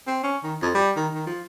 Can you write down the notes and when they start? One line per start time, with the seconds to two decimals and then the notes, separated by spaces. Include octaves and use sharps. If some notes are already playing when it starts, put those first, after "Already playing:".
0.07 C4
0.23 C#4
0.44 D#3
0.62 F2
0.75 G3
0.96 D#3
1.14 D#3
1.27 F3